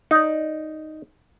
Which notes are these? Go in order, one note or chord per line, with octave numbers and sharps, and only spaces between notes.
D#4 D5